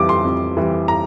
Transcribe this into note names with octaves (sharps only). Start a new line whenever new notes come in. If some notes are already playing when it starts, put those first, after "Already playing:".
Already playing: F2 E3 G3 D6
C6
F2
E3 G3
A#5